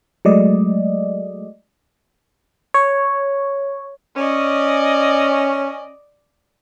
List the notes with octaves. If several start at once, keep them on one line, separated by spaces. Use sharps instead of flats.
F#3 G#3 A3 D5 D#5
C#5
C#4 D5 D#5